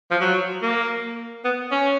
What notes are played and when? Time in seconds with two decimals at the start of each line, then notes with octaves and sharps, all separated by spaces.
0.11 F3
0.21 F#3
0.62 A#3
1.44 B3
1.72 C#4